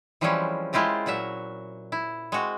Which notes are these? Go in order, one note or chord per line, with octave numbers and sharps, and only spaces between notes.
E3 F3 G3 G#3 C4 C#4
G#3 E4 F4 G4 A#4
A#2 F#3 F#4 E5
E4
G#3 C4 F#4